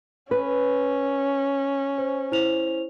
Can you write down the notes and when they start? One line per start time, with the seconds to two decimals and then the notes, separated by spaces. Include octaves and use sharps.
0.31 C#4 B4
1.98 C5
2.32 E4 C5 F7